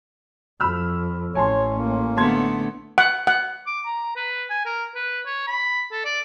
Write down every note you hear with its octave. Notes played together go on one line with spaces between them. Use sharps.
F2 B5 E6 F6
A1 C#4 C#5 G#5 A5 C6
A#3
D3 A3 B3 A5 C6 G#6
F#5
F#5
D6
A#5
B4
G#5
A#4
B4
C#5
B5
A4
D5